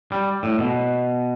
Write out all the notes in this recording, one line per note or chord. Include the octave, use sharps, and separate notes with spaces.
G3
A2
B2